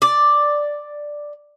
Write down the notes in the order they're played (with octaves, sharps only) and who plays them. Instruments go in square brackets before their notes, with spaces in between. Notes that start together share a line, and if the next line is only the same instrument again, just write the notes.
[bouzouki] D5